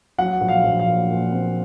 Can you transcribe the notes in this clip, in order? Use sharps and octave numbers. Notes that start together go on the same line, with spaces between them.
F#3 F#5
A#1
F5
A#1
F5
A#2
A#2
C4